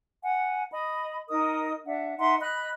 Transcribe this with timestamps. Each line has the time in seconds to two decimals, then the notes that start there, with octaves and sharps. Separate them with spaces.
0.23 F#5 G#5
0.71 D#5 B5
1.30 D#4 A#4 D#5 D#6
1.86 D4 E5 F#5
2.18 D#4 E5 F#5 C6
2.41 D#5 B5 F#6